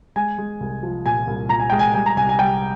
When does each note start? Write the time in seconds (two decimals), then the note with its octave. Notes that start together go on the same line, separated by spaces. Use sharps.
0.16 G#3 G#5
0.38 G#3
0.60 C2
0.83 F3
1.06 A#2 G#5
1.27 C2
1.49 A#2 A#5
1.60 G#5
1.70 G#3 G5
1.79 G#5
1.94 G3 G#5
2.06 A#5
2.17 C2 G#5
2.29 G#5
2.39 G3 G5